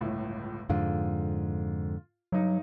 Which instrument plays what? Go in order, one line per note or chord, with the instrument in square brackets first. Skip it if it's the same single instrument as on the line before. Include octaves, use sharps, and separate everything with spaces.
[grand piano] G1 C#2 A2
[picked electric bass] F2 G#2 D3 [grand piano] F4
[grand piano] G2 D#4 [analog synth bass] F#3